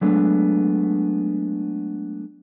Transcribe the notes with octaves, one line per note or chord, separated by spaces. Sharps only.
F#3 G#3 A3 B3 D4